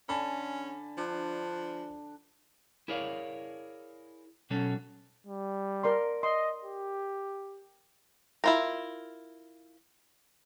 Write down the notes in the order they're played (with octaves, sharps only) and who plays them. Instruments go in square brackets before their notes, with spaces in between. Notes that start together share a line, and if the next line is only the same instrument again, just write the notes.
[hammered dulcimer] D3 [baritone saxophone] C#4 [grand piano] G#5 A5 B5
[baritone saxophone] F3 [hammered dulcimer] D4
[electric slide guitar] E4 G#4 A#4 C#5 D5 F5
B2 F#3 C#4 A4
[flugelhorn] G3
[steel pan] A#4 D5 C6
[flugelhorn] D#5 [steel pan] C6
[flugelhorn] G4
[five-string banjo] E4 F4 A#4